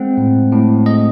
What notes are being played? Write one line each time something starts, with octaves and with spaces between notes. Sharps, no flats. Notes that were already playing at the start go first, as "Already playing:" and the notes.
Already playing: G#3 C4 F#5
A2
A2
G#3 D#5